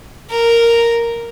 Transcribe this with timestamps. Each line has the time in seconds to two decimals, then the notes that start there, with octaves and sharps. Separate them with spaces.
0.30 A#4